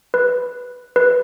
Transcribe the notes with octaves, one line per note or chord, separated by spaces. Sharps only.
B4
B4